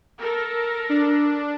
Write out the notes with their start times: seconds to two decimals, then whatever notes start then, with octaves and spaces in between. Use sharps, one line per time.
0.21 A4 A#4
0.89 D4